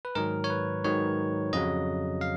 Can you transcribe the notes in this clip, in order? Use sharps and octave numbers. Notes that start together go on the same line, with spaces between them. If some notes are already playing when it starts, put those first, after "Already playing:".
B4
G#2 D#3 F#3 A#4
C#5
B4
G#2 D#3 F#3 C#5
F2 C#3 F#3 D#5
F5